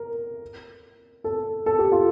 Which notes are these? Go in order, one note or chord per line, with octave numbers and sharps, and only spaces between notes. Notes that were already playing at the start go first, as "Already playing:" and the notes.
Already playing: A#4
A4
A4
G4
F4